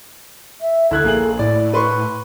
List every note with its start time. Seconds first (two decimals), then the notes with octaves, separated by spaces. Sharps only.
0.61 E5
0.91 D2 E4 A4 F#6 G#6
1.04 A#1 A#3 G#4 F#7
1.39 A2 E4 D5
1.74 B4 C6 C#6